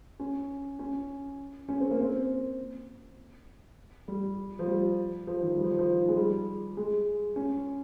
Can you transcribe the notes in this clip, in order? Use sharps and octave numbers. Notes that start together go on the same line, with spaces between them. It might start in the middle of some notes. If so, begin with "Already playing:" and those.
C#4
C#4
C#4
C4
A#3
C4
G3
F3
G3
F3
D#3
G3
F3
D#3
F3
G#3
G3
G#3
C#4